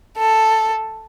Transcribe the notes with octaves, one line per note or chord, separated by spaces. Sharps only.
A4